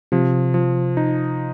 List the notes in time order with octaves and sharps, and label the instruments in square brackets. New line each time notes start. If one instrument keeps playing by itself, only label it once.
[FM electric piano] C3 [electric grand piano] F3
[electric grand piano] F3
D#4